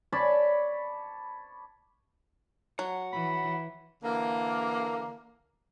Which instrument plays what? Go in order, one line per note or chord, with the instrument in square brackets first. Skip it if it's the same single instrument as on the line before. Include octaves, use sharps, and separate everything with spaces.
[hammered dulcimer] C#5 D5 A5 B5
[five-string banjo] F#3 [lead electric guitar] F#5
[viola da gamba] E3 [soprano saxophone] B5
[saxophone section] D3 E3 A#3